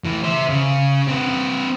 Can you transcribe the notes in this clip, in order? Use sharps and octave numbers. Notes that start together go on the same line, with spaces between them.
A2 E3
C5 E5
C#3
C4 B4